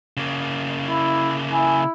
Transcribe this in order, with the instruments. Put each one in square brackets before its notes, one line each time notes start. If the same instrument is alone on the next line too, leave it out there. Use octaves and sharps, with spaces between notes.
[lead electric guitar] C#3 A#3
[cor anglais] E4
[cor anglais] E4 [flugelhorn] G#5